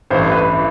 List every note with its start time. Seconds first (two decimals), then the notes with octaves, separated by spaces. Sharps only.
0.10 A1 G2 E3 C5
0.32 B4
0.53 E3